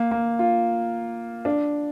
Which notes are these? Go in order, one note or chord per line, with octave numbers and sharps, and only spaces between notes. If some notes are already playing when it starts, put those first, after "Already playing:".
Already playing: A#3
A#3
F4
D4